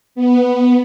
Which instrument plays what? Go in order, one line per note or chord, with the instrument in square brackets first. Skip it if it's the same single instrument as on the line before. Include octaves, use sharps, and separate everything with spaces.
[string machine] B3